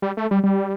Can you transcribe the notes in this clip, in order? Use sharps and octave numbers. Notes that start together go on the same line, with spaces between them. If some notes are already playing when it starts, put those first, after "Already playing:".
G3
A3
G3
G3